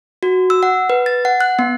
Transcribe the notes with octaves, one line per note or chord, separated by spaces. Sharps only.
F#4
E6
F#5
B4
A6
F#5
F#6
B3